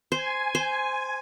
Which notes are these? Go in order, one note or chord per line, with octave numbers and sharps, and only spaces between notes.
C5 G#5
C5